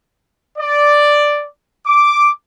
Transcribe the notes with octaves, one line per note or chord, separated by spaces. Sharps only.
D5
D6